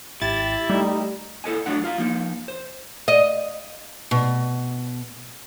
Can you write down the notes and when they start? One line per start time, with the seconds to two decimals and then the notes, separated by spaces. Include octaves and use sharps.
0.22 G#1 E4 G4 A6
0.69 G3 A3 D#4
1.44 E4 A4 D#5 G#5
1.66 F#3 A3 D4 F#5
1.84 F4 F5 A#5
1.98 F3 A#3 D#4
2.48 C5
3.08 D#5
4.11 B2